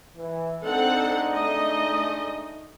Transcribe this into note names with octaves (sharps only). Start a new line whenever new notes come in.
E3
G#3 C4 D4 D#4 A4 F#5
A3 D#5